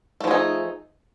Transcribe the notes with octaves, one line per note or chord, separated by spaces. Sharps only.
F3 A3 D#4 G#4